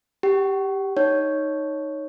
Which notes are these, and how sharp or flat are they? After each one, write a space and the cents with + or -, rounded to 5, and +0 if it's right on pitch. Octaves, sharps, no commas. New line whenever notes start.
G4 +0 F#5 +45
D#4 +0 C#5 +0